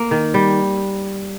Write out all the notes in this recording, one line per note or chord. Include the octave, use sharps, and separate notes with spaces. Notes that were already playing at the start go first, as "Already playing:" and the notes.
Already playing: A#3
D#3
G3